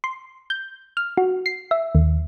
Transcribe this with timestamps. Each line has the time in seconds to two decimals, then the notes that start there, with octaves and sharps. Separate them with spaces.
0.04 C6
0.50 G6
0.97 F6
1.17 F#4
1.46 C7
1.71 E5
1.95 D#2